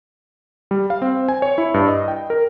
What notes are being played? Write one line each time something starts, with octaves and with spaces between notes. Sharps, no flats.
G3
F5
C4
G#5
C#5
E4
G2
D#5
G5
A#4